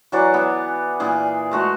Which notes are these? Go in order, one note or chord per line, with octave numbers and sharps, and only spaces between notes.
E3 F#3 D5 F#5
B3 G#4
A#2 E3 G#4
G#3 A3 F#4